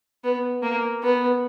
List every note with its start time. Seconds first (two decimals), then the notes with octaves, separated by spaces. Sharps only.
0.24 B3
0.63 A#3
1.03 B3